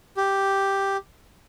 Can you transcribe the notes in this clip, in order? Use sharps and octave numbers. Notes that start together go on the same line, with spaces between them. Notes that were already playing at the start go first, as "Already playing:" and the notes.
G4